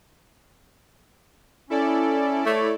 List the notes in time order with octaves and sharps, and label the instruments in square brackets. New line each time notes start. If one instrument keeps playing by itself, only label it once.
[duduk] C#4 [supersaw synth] E4 A4 D5
[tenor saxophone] A3 [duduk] C#5